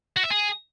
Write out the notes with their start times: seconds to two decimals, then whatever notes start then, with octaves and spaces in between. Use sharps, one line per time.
0.16 F#4
0.23 E5
0.30 G#4